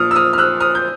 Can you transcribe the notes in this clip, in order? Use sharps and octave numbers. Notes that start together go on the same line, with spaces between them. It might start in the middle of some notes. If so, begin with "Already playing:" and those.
Already playing: A#2 F3 D#6 F6
E6
D#6 F6
F6
E6 F#6
D#6 F6
G6